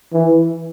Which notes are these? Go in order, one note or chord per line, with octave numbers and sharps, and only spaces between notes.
E3